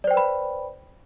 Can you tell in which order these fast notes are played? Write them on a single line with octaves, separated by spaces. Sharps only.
D5 C5 G5 B4 B5